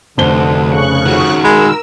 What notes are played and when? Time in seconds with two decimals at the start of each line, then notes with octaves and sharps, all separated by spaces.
0.18 F1 D2 D3 C5 G7
0.69 C#3 C#6 F#6
1.06 F2 D#3 F#4
1.44 G#3 A#4 B5 E6